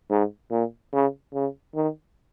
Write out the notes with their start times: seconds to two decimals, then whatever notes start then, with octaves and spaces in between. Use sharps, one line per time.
0.10 G#2
0.51 A#2
0.93 C#3
1.34 C#3
1.75 D#3